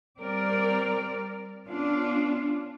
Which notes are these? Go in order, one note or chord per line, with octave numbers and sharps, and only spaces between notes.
G3 C4 A#4 D5
B3 C#4 D4 F4